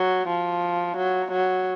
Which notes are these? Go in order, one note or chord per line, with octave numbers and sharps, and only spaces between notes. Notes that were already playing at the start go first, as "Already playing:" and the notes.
Already playing: F#3
F3
F#3
F#3